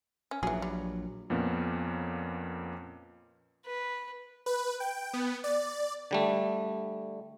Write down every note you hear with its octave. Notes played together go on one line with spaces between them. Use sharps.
C#4
A#1 E3 F#3 G#4
G3
F2 A#2 B3 C#4
B4
B4
G5
B3
D5
D3 G3 A3